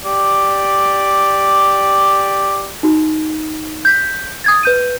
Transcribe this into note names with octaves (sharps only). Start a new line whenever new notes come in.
G4 D5
D#4 F#4
G6 B6
D#6 G#6 A6
B4 G6 D#7